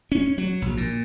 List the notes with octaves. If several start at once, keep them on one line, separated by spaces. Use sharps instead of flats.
C#4
F#3
A#1
A#2